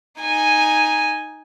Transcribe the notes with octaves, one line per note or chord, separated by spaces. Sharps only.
D#4 G#5